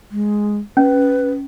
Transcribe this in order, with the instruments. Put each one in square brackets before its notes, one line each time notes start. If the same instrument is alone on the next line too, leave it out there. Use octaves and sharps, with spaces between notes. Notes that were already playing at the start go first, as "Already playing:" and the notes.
[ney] G#3
[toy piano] C#4 [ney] B4